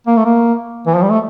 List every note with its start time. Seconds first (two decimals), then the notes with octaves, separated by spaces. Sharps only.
0.07 A#3
0.17 A3
0.25 A#3
0.87 E3
0.95 F3
1.02 G3
1.11 A3